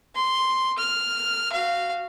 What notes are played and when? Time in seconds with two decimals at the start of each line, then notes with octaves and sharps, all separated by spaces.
0.16 C6
0.78 F6
1.52 F#4 F5